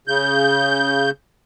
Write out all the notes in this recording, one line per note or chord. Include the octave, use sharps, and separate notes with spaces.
C#3 G6